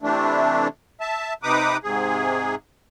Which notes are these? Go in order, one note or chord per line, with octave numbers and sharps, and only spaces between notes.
C3 E3 A3 D4
E5 A5
C3 D#4 B4 D6 D#6
G#2 C3 G#4